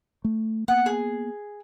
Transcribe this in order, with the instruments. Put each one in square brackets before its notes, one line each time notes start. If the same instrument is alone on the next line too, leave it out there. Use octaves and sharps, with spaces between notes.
[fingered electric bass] A3
[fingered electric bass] A#3 B3 [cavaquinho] F#5
[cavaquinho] G#4